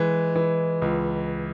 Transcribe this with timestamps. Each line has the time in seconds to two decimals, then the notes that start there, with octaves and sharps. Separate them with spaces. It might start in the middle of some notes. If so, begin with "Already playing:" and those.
Already playing: E3 G#3
0.35 E3
0.82 C#2